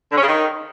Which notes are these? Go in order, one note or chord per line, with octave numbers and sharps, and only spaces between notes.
D3
C#4
C#3
D#3